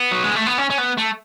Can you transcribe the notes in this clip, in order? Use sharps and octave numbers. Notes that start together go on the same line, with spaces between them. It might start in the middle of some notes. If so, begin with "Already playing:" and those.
Already playing: B3
F#3
G#3
A3
B3
C#4
C#4
B3
A3